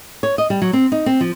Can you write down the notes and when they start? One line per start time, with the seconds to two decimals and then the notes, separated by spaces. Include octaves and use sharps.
0.23 C#5
0.38 D#5
0.50 G3
0.62 F#3
0.73 C4
0.92 D#4
1.06 C4
1.21 F3